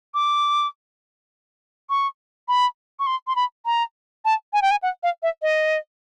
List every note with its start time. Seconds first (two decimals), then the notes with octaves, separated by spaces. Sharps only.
0.14 D6
1.90 C#6
2.48 B5
2.99 C#6
3.06 C6
3.27 C6
3.36 B5
3.66 A#5
4.25 A5
4.53 G#5
4.62 G5
4.71 G#5
4.83 F#5
5.03 F5
5.23 E5
5.42 D#5